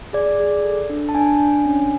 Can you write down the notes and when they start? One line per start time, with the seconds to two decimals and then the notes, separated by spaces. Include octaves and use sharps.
0.13 G#4 D5
0.40 G#4
0.64 A4
0.90 D4
1.09 A5
1.15 D4 G#5
1.39 D4
1.66 C#4